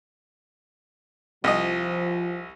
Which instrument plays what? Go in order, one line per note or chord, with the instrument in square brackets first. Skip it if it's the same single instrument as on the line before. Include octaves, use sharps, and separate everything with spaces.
[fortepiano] C2 D#5 [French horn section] F3